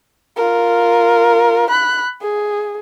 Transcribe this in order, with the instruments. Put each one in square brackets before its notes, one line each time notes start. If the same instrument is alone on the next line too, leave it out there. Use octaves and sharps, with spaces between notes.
[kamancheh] F4 A#4
B5 F#6
G#4